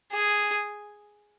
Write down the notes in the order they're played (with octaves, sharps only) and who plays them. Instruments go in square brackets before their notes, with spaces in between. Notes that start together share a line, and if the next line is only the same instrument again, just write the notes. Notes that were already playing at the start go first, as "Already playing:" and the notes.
[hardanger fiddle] G#4